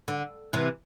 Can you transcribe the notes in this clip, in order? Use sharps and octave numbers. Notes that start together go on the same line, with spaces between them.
D3
C3 E3